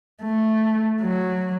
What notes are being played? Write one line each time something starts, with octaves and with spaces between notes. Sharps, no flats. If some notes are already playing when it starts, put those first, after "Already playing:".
A3
F#3